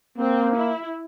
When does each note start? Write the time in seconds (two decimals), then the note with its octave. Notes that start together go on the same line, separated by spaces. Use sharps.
0.18 A#3 C4
0.57 E4